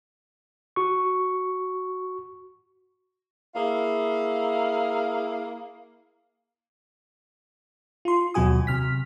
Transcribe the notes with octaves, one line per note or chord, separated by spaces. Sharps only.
F#4 C#6
A#3 E4 G#4 F5
F4 C6
D#2 B2 F#3 F#4 G#5 D#6
C3 F6 B6